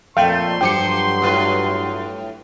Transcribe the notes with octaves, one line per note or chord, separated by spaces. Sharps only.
F2 A#2 A3 F5 G5 C6
G2 F3 F#3 G4 G5 C#7
A2 F4 B4